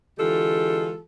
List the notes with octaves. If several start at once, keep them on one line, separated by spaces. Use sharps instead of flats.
D3 E3 G#3 F4 G4 A4